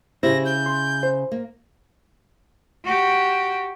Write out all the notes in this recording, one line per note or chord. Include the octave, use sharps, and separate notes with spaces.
C#3 E4 G4 C5 A#6
G6
C6
C5
A#3
F#4 G4